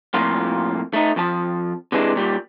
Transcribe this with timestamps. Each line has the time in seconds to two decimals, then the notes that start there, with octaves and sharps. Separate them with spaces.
0.14 F2 A2 A#3 F4
0.93 A3 D#4
1.16 F2 F3 A5
1.92 C3 E3 G#3 C#4 D4
2.16 A#2 G3